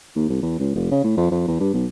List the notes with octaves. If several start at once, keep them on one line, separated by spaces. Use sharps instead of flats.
D#2
C2
E2
C#2
F1
C#3
A2
F2
F2
E2
G2
B1